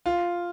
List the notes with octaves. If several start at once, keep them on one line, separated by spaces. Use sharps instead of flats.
F4